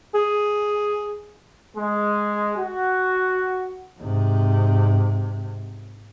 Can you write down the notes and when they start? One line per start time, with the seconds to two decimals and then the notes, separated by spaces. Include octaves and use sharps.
0.15 G#4
1.76 G#3
2.57 F#4
3.99 G#2 C3